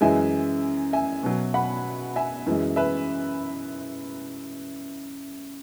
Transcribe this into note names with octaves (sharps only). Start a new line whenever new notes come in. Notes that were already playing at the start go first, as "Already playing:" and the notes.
F#2 E3 G#3 E5 G#5
E5 G#5
B2 F#3
F#5 B5
E5 G#5
F#2 E3 G#3
B4 E5